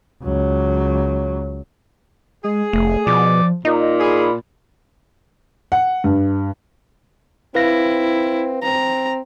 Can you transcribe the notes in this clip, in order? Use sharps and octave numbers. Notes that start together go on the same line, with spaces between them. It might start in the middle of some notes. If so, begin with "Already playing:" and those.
C#2 F#3
G#3 G#4
F1 A3
B2 F3 D5
A#2 D#4 D#5
G#4 B5
F#5
G2
C4 E4 B4 F5 A#6
C4 A#5